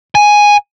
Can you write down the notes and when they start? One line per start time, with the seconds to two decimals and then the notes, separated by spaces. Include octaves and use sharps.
0.15 G#5